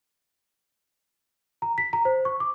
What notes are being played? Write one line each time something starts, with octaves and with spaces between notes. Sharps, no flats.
A#5
B6
A#5
C5
C#6
D6